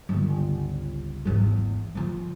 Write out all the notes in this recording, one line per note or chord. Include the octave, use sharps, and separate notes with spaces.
G1 C#2
G#1 E2
F2 F3